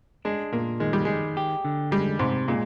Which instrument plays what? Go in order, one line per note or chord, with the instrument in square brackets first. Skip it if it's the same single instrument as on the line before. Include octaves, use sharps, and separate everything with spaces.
[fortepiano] G#3 [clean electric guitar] D4
[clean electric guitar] A#2 [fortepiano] A#3
[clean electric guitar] D#3 [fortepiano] G#3
[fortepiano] G3
[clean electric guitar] D#3 [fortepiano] G#3
[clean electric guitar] G4
D3
[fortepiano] G3 [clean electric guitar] G#3
[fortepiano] G#2 [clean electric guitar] C3
[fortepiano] A#2 [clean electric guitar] G#3